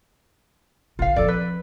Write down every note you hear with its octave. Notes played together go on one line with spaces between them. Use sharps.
A#1 D3 F4 F5
F3 C4 A4 D5
B4